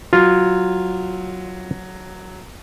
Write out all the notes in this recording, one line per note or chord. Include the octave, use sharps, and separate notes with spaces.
F#3 F4